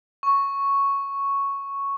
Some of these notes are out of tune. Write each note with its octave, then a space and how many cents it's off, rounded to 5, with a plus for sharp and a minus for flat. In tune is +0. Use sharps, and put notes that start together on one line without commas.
C#6 +0